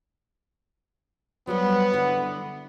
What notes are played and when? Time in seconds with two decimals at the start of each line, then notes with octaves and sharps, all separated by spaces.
1.47 F#3 G3 B3 C5
1.94 D3 E4